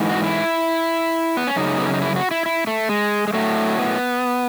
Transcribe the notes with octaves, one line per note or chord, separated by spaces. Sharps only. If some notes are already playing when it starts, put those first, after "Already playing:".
Already playing: G#2 E3
F#4
E4
B3
C#4
F#2 C#3 D#4
B3
C#4
D#4
E4
F#4
E4
E4
A3
G#3
G#3
A2 F#3 A3
B3